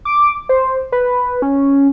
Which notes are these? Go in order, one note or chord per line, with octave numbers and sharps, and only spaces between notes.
D6
C5
B4
C#4